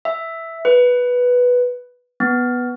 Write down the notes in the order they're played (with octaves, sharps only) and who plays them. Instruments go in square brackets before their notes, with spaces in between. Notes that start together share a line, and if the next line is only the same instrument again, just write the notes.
[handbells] E5
B4
B3